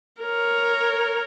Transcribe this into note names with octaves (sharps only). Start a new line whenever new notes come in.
A#4 C#5